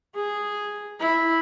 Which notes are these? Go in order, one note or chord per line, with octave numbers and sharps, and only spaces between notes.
G#4
E4